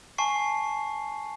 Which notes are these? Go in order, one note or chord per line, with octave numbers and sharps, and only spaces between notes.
G#5 A5 C#6 C7